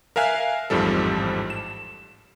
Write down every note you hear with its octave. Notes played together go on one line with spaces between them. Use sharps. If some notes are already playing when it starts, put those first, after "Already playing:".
A#4 E5 F5 G#5 F#6
A1 F2 G#2 F3 G3 A4
E7